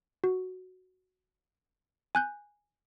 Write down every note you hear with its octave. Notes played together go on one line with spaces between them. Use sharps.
F#4
G#5 F#6 G6